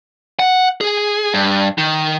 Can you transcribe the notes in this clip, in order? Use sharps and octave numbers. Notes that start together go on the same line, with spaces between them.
F#5
G#4
G2
D#3